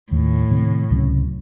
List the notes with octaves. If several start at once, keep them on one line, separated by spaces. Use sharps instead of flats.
D#2 A2 D#3 A3
C3 D#3 A3 C4
C#2 C3 F#3 C#4